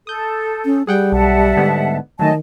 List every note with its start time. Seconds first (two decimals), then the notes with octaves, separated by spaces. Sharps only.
0.07 A4 D#6 G6
0.65 C#4
0.87 G3 G#4 F#5 G5
1.12 B1 E5 F#5 A5
1.57 G#2 D3 B3
2.19 D#3 F#3 A3 D#5 G#5 A5